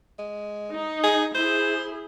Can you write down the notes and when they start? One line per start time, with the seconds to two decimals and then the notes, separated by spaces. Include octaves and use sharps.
0.19 G#3
0.72 D#4
1.03 G#4
1.34 E4 G#4 C5